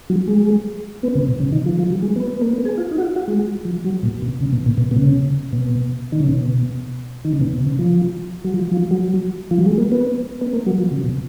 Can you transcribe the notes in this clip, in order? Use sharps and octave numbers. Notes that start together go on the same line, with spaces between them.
F#3
G#3
B3
C#3
B2
C#3
D#3
F3
F3
F#3
G#3
B3
A#3
B3
G#4
F4
D#4
F#4
F4
F#4
G#3
F3
F#3
A#2
B2
C#3
B2
A#2
B2
B2
C#3
B2
D#3
C#3
B2
D#3
C#3
B2
B2
C#3
F3
F#3
F3
F3
F#3
F3
F#3
G#3
A#3
B3
B3
A#3
F#3
F3
C#3
B2